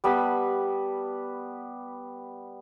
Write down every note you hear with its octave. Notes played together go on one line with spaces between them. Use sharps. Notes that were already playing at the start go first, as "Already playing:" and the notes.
G3 B3 A5 B5